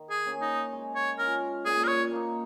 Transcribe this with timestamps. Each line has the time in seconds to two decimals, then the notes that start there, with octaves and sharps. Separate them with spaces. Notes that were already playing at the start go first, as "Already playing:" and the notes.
Already playing: D#3
0.10 G#4
0.26 A#3 C#4
0.41 D#4
0.72 G#3
0.95 C#5
1.18 C#4 F4 A#4
1.65 A#2 G#4
1.84 A#4
1.88 C#5
2.11 A#3 D#4